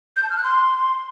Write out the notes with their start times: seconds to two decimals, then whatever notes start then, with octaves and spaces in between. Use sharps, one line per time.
0.16 G6
0.23 A5
0.30 F6
0.37 F#6
0.44 C6